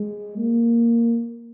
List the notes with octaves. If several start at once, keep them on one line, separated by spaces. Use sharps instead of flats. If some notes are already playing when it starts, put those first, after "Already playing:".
Already playing: G#3
A#3